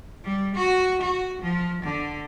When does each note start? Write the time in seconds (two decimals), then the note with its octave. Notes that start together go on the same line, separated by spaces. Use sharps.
0.24 G3
0.56 F#4
1.02 F#4
1.42 F3
1.83 D3